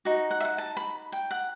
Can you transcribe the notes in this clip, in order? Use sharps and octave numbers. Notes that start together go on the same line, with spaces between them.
D#4 F#4
F#5
E5
F#5
A5
B5
G5
F#5